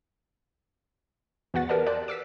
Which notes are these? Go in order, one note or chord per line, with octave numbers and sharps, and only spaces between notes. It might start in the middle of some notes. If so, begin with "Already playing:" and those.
E2 F#4 F#5 A6
G4 A#4 B4 D5 A5
C5 D5 G5 A5 F#6
D6 E6 B6